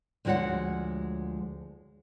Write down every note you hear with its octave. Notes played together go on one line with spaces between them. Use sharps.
D2 F3 G#3 F#4 C#5 F#5